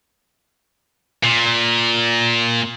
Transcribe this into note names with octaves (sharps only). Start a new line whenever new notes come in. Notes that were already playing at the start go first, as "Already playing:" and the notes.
A#2